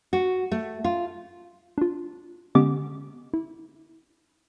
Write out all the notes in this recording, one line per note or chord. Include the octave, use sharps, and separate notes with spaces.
F#4
A3
F4
D4 F4
D3 G#3 B3 C#4 G4 D6
E4